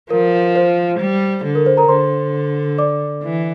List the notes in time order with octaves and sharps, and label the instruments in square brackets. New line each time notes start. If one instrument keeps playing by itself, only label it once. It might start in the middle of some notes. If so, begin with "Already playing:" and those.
[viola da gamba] F3 [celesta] A#4
[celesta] C5
[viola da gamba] G3
D3
[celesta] A#4
C5
A#4 A#5
[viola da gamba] D3 [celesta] C5 C6
[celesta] D5 D6
[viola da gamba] E3